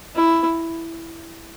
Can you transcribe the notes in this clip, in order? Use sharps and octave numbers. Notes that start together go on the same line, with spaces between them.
E4